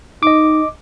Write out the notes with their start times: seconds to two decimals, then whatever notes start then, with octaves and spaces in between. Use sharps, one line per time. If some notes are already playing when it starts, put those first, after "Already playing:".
0.23 D#4 D#5 D6